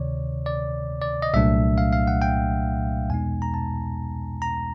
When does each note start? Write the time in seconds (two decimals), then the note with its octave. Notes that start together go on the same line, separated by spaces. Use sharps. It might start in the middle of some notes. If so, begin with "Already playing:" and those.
Already playing: D2 C3 D#3 C#5 D5
0.46 D5
1.01 D5
1.22 D#5
1.34 C2 A#2 F#3 A3 D4 E5
1.78 F5
1.93 F5
2.07 F#5
2.22 G5
3.09 E2 B2 G#3 B3 D#4 G#5
3.42 A#5
3.54 A5
4.42 A#5